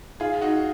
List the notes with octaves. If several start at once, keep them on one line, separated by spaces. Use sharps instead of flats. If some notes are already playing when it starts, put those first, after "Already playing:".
F4 G#4
D#4 F#4